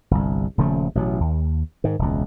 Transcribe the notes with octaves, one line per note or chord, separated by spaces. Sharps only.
G1 C2
D#1 C#3 F3 A3
A1 B2 F#3
D#2
G#2 D#3
E1 C#2